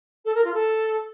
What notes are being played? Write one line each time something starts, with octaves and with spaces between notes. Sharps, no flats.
A4
A#4
F4
A4